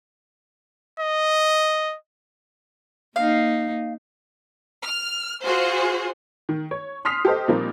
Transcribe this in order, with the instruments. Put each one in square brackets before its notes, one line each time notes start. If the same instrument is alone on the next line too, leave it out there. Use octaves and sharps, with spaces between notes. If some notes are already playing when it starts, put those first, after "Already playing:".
[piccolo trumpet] D#5
[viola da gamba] A#3 D#4 [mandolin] F5
[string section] F6
F4 F#4 G#4 C5 C6
[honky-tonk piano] D#3
C#5
C6 D#6 F6 B6 C7 F7
G4 A4 C5 D#5
A#2 F3 G3 A#3 C4 D#4